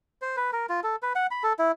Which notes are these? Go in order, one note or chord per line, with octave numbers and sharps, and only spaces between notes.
C5
B4
A#4
F4
A4
B4
F#5
B5
A4
E4